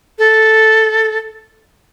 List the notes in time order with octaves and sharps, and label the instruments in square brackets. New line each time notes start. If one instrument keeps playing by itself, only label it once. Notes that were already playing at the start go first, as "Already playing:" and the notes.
[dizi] A4